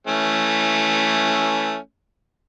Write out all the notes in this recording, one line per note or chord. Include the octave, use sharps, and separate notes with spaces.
E3 A3 C#4